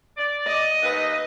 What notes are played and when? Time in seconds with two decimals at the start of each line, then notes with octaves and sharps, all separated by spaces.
0.17 D5
0.47 D#5
0.82 D#2 B4